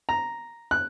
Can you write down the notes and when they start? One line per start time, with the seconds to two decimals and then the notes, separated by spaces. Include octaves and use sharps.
0.09 A#5
0.71 F#6